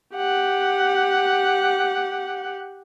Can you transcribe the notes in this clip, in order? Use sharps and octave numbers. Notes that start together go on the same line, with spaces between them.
G4 F#5